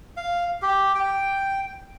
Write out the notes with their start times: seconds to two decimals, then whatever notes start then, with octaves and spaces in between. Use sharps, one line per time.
0.17 F5
0.62 G4
0.95 G5